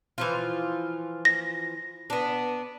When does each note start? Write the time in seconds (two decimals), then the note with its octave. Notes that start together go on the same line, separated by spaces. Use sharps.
0.18 E3 F3 F4
1.25 A#6
2.10 B3 D4